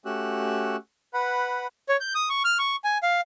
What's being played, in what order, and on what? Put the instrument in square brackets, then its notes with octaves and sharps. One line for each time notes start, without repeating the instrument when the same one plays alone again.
[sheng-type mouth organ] A3 C#4 F#4 G4 E6 F#6
B4 F#5 B5
C#5
G6
D#6
C#6
F6
C#6
G#5
F5